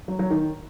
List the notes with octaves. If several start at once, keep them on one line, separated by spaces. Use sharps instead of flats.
F#3
F#3
D#3